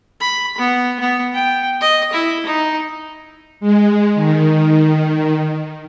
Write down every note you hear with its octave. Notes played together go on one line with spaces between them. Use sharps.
B5
B3
B3
G5
D#5
E4
D#4
G#3
D#3